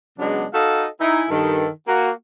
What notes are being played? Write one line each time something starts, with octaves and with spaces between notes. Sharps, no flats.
C#3 F#3 G#3 B3 D4
D#4 F#4 A4 D#5 F5
D#4 E4 G#5
G2 D#3 A4
A#3 F#4